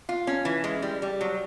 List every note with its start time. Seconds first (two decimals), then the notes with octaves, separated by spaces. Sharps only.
0.09 F4
0.27 C#4
0.45 E3
0.64 G#3
0.82 G3
1.02 G3
1.21 F#3